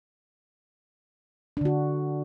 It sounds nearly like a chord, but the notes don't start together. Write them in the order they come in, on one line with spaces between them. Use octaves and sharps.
D4 D3 F#4